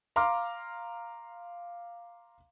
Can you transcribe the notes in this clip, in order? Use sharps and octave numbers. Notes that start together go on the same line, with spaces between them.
F5 A#5 C6 D6 F6